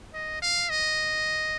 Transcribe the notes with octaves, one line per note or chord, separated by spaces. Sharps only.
D#5
F5
D#5